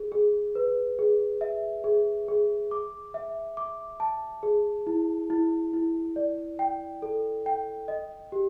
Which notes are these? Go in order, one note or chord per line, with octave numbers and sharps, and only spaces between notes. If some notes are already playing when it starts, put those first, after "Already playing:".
Already playing: G#4
G#4
B4
G#4
E5
G#4
G#4
D6
E5
D6
A5
G#4
E4
E4
E4
D5
G5
A4
G5
D#5
G4